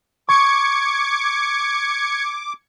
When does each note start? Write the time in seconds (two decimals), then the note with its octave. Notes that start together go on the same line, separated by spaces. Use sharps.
0.29 C#6 D6 G#6 C#7